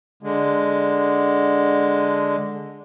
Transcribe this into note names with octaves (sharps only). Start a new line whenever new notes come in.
D3 G#3